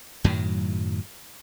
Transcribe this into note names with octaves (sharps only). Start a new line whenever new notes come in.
F#2 A2 D#3 F#3